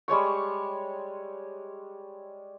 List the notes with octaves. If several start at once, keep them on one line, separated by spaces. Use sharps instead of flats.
G3 G#3 C#5 C#6